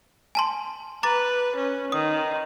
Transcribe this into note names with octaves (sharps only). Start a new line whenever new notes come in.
G#5 A5 C6
B4 A#5 D6 A6
C#4
D#3 D#6